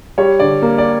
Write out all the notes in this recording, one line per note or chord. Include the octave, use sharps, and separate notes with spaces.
G3 C#5
D3 D5
A#3
D5